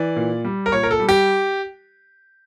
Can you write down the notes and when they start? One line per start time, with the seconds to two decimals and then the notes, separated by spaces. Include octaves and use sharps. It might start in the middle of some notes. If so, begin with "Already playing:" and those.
Already playing: E3 D5
0.16 A#2
0.45 G3
0.66 A#4
0.72 A#2 C#5
0.83 A#4
0.91 A4
1.00 G3
1.09 G4